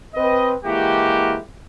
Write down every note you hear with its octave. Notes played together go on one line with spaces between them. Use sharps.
C4 B4 D#5
E3 G#3 A#3 E4 F#4 G4